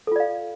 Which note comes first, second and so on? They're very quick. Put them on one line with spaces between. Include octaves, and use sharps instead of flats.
A4 F4 D5 F5